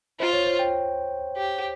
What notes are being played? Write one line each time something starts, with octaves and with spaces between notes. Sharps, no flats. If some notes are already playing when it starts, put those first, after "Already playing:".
F4 C5
C#5
C5
G5
G4